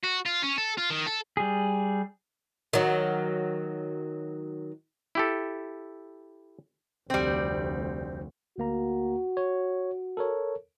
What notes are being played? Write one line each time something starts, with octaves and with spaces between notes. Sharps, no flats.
F#4
F4
C#4
A4
F4
D#3
A4
G3 G#4
D#3 F#3
E4 G4 A4
F1 D2 G3 C4
D2 A#3 F#4 A#5
C#5
A4 A#4 C#5